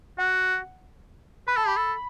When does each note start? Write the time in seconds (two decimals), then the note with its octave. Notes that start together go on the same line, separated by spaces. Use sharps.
0.18 F#4 F#5
1.48 B4 B5
1.57 A4 A5
1.67 G4 B5
1.77 A4